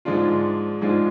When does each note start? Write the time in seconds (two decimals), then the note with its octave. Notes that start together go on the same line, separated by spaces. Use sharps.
0.05 G#2 F3 G#3 D4 F4
0.81 G#2 F3 G#3 D4 F4